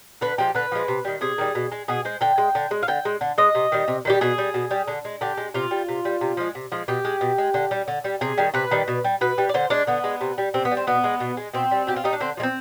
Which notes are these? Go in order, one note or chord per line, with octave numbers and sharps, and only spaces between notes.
D3 B4
F3 G#3 G4
D3 B4
F3 G#3
C3
D#3 G3
C3 G#4
D#3 G3
B2
G#3
B2 G#4
G#3 C5
D3 G5
G#3
D3
G#3
F5
D3 G5
G#3
D3
G#3 D#5
C3
D#3 G3
C3
D#3 G3 G4
B2 G#4
G3
B2
G3
D3
G#3
D3 G4
G#3
C3 F4
G3
C3
G3
C3
F3 G#3
C3
F3 G#3
B2 G4
G#3
B2
G#3
D3
G3
D3
G3
C3 G#4
D#3 G3
C3 B4
D#3 G3
B2
G3
B2 B4
G3
D5
D3 C5
G#3 D4
D3 B3
G#3
C3
G3
C3 C4
B3
G3
C4
B2 B3
G#3
B2
G#3
B2 C4
G3
B2 G4
F4
G3 D#4
D4
D3 C4
F3 G#3
C4